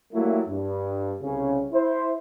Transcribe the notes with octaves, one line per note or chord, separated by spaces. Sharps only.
F#3 G3 A3 A#3 E4
G2
C2 C#3 C#4
E4 C5